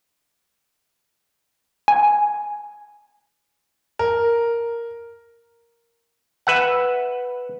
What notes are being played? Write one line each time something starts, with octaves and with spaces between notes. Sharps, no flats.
G#5
A#4
B4 E5 F#5